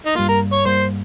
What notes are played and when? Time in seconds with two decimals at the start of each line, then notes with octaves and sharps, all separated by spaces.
0.06 D#4
0.15 G2 G3 A#3 F4
0.28 A#4
0.52 C#5
0.65 G2 G3 A#3 C5